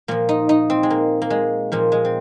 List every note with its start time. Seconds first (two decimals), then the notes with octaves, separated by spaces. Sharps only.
0.08 A#2 F3 A#3
0.29 D#4
0.49 D#4
0.70 C4
0.83 G#3
0.90 A#3
1.22 A#3
1.30 G#3
1.72 A#2 F3 A#3
1.92 G#3
2.05 C4